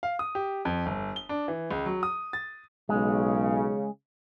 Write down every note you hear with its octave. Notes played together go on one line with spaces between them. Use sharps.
F5
D#6
G4
F2
G1
G7
D4
E3
C#2
F#3
D#6
A6
B1 C#3 G#3